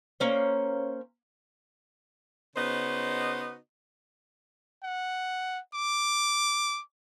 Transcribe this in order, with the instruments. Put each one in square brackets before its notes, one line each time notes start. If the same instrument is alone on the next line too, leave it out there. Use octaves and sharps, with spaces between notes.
[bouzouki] A#3 C#4 C5
[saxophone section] C#3 B3 D#4 F#4 C5 D#5
[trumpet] F#5
D6